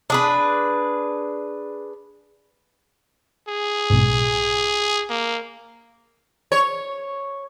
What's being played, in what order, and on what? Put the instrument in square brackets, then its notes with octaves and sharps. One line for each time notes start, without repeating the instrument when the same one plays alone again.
[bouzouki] D4 G#4 B4
[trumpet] G#4
[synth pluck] B1 G#2
[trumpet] A#3
[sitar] C#5